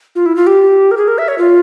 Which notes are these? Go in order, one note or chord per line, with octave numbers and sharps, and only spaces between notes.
F4
E4
F4
G4
A#4
G#4
A#4
E5
C#5
F4